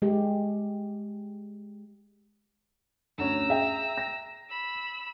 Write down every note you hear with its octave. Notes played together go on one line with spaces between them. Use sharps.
G#3 G4
D2 C#4 A#5 E6
G#4 E5 G5
A#6
B5 E6